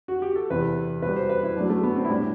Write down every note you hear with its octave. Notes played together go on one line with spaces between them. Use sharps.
F#4
G4
A4
E2 C3 E3 B4
B2 G3 B4
C5
B4
E4
F#2 F#3 A3 D4
A3
B3
C4
E4
A2 G3 D4